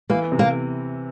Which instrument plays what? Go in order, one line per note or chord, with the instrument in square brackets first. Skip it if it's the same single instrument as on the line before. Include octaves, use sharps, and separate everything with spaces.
[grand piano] E3 [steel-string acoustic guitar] A#3
[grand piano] C3
[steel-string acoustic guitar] A#3